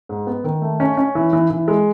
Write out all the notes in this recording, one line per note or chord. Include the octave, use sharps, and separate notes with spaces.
G#2
B3
D#3
A3
C#4
C#4
E3
E3
E3
G#3